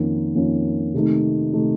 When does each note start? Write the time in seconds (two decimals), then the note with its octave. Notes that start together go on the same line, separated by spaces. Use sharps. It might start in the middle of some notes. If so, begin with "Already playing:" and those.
Already playing: F2 D#3 A#3 C#4
0.35 F2 D#3 A#3 C#4
0.94 C3 D#3 A3 D#4
1.53 C3 D#3 A3 D#4